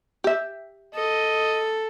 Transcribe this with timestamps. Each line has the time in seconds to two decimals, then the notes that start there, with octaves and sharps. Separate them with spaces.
0.24 G4 E5
0.95 A4 D#5